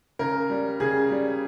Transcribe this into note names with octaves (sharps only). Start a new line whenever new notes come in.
C#3 A#4
G3
C#3 G#4
G3